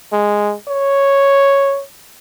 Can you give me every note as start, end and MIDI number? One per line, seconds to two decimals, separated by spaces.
0.13 0.54 56
0.68 1.82 73